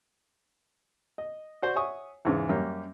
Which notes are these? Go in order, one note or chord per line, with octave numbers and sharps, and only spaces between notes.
D#5
F#4 C5 D5
C#5 E5 F#5 G#5 C#6 D#6
E2 G#2 C#3
F#2 G3 A#3 C#4